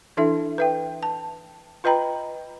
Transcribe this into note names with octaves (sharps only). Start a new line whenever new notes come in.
E3 D4 E4 A4 E5
B4 E5 G5
A5
F4 B4 D#5 G5 A#5 B5